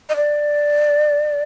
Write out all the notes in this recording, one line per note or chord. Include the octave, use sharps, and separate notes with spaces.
D#5
D5